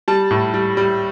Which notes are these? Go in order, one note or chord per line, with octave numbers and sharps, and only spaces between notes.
G3 A5
A2
G3
G3